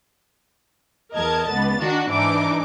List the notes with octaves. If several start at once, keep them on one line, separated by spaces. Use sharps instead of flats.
E2 A#4 D#5 A5 G#6
C#2 B3 A6
D#3 D4 F#4
G#2 E3 D4 D#4 D6